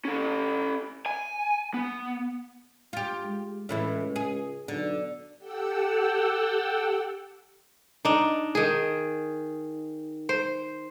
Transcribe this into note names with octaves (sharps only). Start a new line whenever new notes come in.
C#4 A4
G#5
B3
F4 G4
G#3
C#2 A2 E3 E4
G#4
B1 D3
G4 A4 F#5 G5 E6
D4 D#4
D#3 G#4
C5